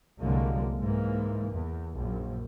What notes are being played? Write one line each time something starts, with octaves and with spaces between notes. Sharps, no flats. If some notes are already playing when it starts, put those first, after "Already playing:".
C2 F#2 D3 F#3 G#3 A#3
G#2 E3 A#3
E2
A#1 F#2